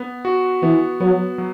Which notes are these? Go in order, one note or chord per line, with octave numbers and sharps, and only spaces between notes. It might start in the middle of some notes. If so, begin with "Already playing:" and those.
Already playing: B3
F#4
E3 B3
F#3 B3
F#3